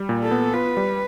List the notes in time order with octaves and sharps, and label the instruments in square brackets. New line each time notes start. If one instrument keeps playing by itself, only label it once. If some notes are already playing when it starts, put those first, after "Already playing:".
Already playing: [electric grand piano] G3
A#2
[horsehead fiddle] A4
[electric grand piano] B3
[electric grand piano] F4 [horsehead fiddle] B4
[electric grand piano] G3